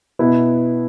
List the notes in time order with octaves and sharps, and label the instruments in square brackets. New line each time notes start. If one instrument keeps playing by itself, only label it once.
[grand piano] B2 B3 E4